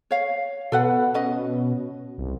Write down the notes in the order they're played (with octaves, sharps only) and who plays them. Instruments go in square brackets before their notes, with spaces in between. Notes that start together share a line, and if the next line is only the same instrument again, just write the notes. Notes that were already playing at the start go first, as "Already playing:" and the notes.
[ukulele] C#5 F5
[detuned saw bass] B2 [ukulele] A4 B4 F#5
[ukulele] C#4 D#5
[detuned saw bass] C2